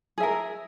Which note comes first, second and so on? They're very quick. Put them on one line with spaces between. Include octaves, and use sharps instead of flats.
G#4 E5 A#4